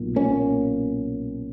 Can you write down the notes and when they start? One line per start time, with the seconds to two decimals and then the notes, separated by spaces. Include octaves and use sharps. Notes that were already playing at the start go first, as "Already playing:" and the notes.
Already playing: B1 A#2
0.16 A#3 C#4